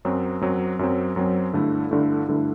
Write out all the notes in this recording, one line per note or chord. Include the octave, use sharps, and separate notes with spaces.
F#2 F#3 C4
F#2 F#3 C4
F#2 F#3 C4
F#2 F#3 C4
G2 D3 A3 E4
G2 D3 A3 E4
G2 D3 A3 E4